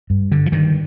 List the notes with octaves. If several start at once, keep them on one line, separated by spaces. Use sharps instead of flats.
G2
D3
F3
G2 D#3